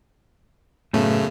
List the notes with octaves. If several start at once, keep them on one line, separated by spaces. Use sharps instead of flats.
F#2 A2 C#3 A3 B3